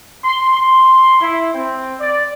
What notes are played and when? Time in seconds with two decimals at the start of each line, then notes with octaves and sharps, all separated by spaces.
0.24 C6
0.56 C6
1.20 E4
1.53 C4
1.98 D5